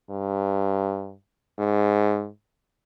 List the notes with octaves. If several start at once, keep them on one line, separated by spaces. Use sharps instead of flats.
G2
G#2